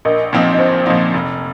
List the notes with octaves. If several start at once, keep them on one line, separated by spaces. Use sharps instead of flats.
A#1 A#4 D#5
A#2 F3 C4 D#4
D#5
A#1 C5
A#2 F3 C4 D#4
F1